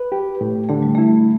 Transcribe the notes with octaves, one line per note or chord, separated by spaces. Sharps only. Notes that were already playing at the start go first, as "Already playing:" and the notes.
Already playing: B4
G4
A2
D3 A3
G3
A3 E4